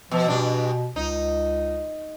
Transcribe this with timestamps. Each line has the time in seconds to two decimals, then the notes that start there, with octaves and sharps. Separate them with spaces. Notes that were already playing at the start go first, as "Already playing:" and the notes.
0.11 B2 F3
0.28 G2 B2 D4
0.96 C#2 D#4